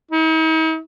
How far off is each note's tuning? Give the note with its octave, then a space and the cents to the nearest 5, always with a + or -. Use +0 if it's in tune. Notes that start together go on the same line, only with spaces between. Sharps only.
D#4 +45